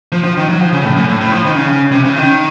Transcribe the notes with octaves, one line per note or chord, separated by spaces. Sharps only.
F3
F3
D#3
F#3
F3
C#3
A2
F#2
A2
A2
F3
D#3
C#3
C3
C#3
D#3